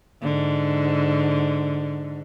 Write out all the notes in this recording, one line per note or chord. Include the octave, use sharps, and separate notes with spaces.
G#2 D3